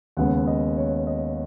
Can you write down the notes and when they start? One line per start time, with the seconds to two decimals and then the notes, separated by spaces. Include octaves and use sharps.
0.17 D#2 C#3 G#3 B3 F#5
0.47 D#5
0.77 C#5
1.07 D#5